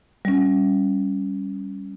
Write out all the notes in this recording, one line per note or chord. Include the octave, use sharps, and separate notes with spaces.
G3 C#4